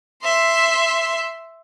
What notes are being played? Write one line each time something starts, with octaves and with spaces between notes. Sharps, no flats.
E5 C6